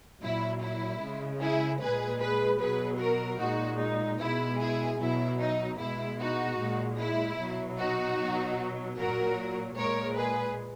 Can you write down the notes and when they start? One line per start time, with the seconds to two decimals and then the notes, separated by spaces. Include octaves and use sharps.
0.22 A#2 F#3 E4
0.62 E4
1.01 C#3 G#3
1.42 E4 G#4
1.81 A#2 G#3 G#4 B4
2.21 G#4 B4
2.61 B2 F#3 G#4 B4
3.00 F#4 A#4
3.40 A#2 G#3 D#4 F#4
3.80 D#4
4.20 B2 G#3 E4
4.60 E4 G#4
5.00 B2 F#3 E4
5.40 D#4
5.79 B2 G#3 E4
6.20 D#4 F#4
6.59 A#2 G#3
6.99 E4
7.39 B2 F#3
7.78 D#4 F#4
8.19 B2 F#3
8.98 A#2 F#3 F#4 A#4
9.78 A#2 G#3 A#4 C#5
10.18 G#4 B4